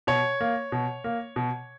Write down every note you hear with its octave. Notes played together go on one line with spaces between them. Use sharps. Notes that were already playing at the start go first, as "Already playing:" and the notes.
B2 C#5
A#3
B2
A#3
B2